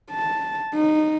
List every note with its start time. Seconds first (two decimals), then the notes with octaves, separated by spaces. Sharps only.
0.11 A5
0.74 D#4